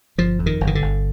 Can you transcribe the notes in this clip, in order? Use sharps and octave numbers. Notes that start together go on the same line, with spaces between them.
G1 F3
F2
D#3
G1
D#3
D3
G1